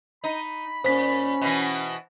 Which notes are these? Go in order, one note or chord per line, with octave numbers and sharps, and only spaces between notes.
D#4 B5
A#2 C#4 C5 B6
B2 E3